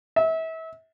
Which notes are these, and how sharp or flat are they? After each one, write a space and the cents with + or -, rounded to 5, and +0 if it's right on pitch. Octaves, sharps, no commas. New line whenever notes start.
E5 -35